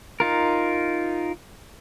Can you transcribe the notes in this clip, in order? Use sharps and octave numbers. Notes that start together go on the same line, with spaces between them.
D#4 F4 A#4